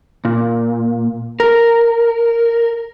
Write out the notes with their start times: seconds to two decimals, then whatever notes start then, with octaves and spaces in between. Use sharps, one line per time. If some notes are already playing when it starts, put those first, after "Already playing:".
0.25 A#2
1.40 A#4